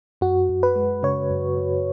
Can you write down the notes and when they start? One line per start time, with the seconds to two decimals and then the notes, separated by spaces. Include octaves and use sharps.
0.21 F#2 F#4
0.49 F#2
0.63 B4
0.76 G#3
1.03 C#3 C#5
1.31 F#2
1.57 F#2